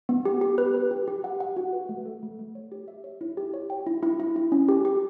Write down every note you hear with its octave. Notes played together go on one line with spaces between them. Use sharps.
B3
G4
G4
B4
B4
G4
G4
F#5
F#5
F#4
B4
A3
A4
A3
A3
C#5
G4
E5
C#5
E4
G4
C#5
G5
E4
E4
E4
E4
C#4
G4
G4